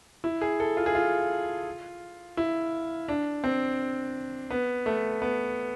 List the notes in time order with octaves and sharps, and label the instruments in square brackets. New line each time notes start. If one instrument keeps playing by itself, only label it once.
[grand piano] E4
G#4
A4
F4
G#4
F4
E4
D4
C4
B3
A3
B3